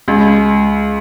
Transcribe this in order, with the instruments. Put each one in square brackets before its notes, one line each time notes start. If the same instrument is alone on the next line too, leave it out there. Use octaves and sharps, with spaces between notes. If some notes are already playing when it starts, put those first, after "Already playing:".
[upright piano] C#2